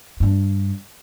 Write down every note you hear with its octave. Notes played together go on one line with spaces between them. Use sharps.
G2 D4